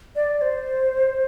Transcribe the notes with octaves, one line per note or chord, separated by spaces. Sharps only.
D5
D5
C5